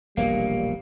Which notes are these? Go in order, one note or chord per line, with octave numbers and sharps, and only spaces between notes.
E1 A#1 A#2 G3 A#3 F5